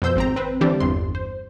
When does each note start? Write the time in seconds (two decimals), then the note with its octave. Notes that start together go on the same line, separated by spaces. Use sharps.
0.02 F2 B2 C5 E6 G6
0.16 G#1 C4 A#5
0.36 C4 B4
0.61 D3 E3 G3 C4 D4 G4
0.80 G1 E2 C6
1.15 C5